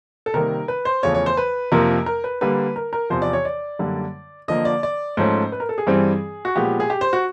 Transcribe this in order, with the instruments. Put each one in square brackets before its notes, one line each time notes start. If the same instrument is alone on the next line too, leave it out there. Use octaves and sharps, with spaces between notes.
[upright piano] A4
[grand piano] C3 D#3 G3 A#3 [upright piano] A#4
[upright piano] B4
C5
[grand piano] E2 C#3 F3 A3 [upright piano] C#5
[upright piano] C#5
C5
B4
[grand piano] F2 C3 F3 A#3 [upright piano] A#4
[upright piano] A#4
B4
[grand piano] D3 G3 A#3 [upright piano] B4
[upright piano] A#4
A#4
[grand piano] E2 C3 F3 [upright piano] C5
[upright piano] D5
C#5
D5
[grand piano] F#2 D3 G3 A#3 D4
[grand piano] D3 F3 A#3 [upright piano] D#5
[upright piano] D5
D5
[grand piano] G#2 F3 A3 C#4 [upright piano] C5
[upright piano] B4
A#4
A4
G#4
[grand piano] G2 E3 G3 C4
[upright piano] F#4
[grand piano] A#2 F3 G#3 B3 [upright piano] G4
[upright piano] G#4
G4
C5
F#4